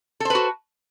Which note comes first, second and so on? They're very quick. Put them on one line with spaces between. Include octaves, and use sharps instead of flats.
A4 C5 B4 F#4